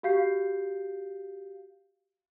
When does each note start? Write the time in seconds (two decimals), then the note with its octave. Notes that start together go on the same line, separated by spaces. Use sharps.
0.03 F#4 G4 F5 G6 C7